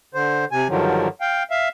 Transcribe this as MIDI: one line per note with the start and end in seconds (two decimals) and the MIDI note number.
0.14 0.45 50
0.14 0.45 72
0.52 0.68 48
0.52 0.68 80
0.69 1.08 43
0.69 1.08 50
0.69 1.08 51
0.69 1.08 53
0.69 1.08 54
1.21 1.43 77
1.21 1.43 79
1.50 1.68 76
1.50 1.68 77